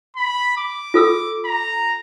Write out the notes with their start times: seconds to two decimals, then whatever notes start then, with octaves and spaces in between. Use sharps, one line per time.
0.17 B5
0.58 D6
0.94 F4 A4 E6
1.45 A#5